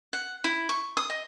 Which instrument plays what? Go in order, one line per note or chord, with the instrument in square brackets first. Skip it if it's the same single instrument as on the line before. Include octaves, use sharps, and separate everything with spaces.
[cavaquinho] F#5
E4
C#6
D#6
D#5